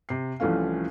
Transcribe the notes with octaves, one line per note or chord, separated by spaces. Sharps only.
C3 C7
C2 E3 F3 A3 C#4 F5